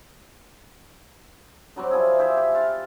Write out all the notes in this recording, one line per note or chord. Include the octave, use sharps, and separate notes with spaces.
D3 F#3 G3 C4
C3 F3 E4 G#4
G4 G#4 C5 E5
G4
F4 F5